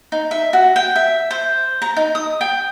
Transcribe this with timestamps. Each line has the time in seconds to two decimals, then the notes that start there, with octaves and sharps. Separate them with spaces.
0.12 D#4
0.31 E5
0.53 F#4
0.76 G5
0.96 E5
1.31 C5
1.82 A#5
1.97 D#4
2.15 D#6
2.41 G5